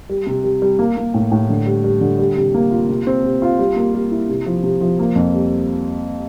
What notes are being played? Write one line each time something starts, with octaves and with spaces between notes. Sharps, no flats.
G3
C3
G3
G3
A#3
A#3
A2
A2
D3
G3
G3
D3
G3
C3
A#3
F4
C3
C4
C3
F4
G3
A#3
G3
E4
C3
F3
C3
F3
A#3
F2
G3